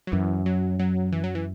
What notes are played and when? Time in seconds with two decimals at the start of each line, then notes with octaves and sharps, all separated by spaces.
0.07 F#3
0.12 F#2 E3
0.46 F#3
0.79 F#3
1.12 E3
1.24 F#3
1.35 E3